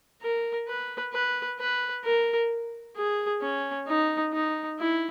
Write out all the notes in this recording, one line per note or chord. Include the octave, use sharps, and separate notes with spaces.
A#4
B4
B4
B4
A#4
G#4
C#4
D#4
D#4
E4